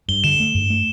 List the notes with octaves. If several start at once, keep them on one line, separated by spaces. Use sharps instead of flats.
G2 G7
D3 E7
A3
G2
A3